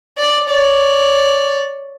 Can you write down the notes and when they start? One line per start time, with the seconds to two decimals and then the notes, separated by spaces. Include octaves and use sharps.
0.18 D5
0.47 C#5 D5